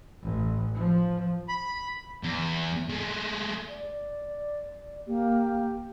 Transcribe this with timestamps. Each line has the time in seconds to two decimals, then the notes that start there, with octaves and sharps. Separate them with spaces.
0.23 A1
0.74 F3
1.48 B5
2.24 E2
2.90 G#3 A3
3.69 D5
5.07 A#3 G4